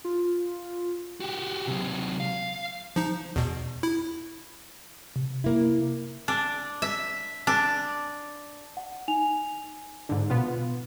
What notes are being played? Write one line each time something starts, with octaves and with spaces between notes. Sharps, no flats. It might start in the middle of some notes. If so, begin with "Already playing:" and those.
F4
F#4 G4
C3 F#3
F5
F3 D#4
E2 B2
E4
C3
A#3 E4
D4
E5
D4
F#5
D#4 G#5 F7
G#2 D3
B2 B3 F4